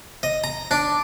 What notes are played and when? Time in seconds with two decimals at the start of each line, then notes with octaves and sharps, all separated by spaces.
0.23 D#5
0.44 A#5
0.71 D4 D6